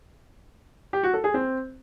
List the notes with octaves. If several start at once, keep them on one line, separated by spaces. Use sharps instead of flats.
G4
F#4
A4
G#4
C4